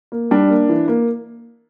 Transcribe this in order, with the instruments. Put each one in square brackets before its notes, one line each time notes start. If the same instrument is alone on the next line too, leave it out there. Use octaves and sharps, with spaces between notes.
[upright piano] A#3
G3 D4
A#3
E3
A#3